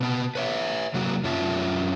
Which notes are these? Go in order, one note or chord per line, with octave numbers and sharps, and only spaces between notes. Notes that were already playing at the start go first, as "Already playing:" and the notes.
B2 B3 A5
B4 C#5 E5
C3 F#3 A#3 F#4
F#2 C#4 F4 E5 A5